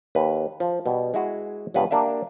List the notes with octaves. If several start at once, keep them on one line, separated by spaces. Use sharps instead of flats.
D#2 B4
F3
B2 G3
G#3 E4 F#4 G#4
C#2 G2 B3 B4 F5
A#3 D4 G4 E5